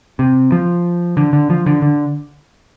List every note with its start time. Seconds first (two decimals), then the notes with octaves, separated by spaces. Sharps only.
0.19 C3
0.52 F3
1.17 D3
1.33 D3
1.50 F3
1.66 D3
1.82 D3